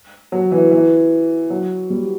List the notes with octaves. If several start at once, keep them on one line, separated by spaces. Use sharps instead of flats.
F#3
E3
E3
F#3
G3